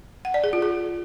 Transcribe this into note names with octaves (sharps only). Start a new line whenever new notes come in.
F#5
D5
G#4
F4
G#4